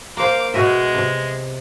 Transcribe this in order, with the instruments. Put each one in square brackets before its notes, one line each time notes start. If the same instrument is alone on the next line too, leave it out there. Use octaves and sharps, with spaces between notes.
[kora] A#3 C5 [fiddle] F5 D6
[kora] B2 D#5 E5 [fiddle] G#3
[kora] C3